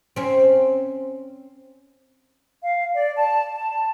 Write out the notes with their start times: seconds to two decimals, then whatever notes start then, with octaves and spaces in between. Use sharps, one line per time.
0.16 C4 C#4
2.62 F5
2.93 D5
3.16 A5
3.54 A5